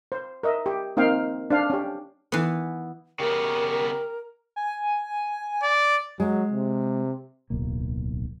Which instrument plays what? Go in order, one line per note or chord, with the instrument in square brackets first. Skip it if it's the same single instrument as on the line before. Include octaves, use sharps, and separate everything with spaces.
[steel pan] C5
A#4 D#5 E5
G4
A#3 C4 D#4 F5 G5
D4 C5 F5
C#4 G4
[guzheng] E3 B3
[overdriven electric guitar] C#3 B3 [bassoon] G4 [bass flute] A#4
[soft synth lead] G#5
[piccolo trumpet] D5
[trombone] F#3 [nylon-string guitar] G#3
[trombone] C3
[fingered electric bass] D1 B1 A#3